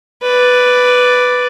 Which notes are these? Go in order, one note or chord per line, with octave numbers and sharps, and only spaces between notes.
B4 D5